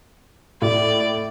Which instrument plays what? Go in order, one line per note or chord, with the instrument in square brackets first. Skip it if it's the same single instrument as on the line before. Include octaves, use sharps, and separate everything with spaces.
[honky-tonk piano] A2 [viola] D5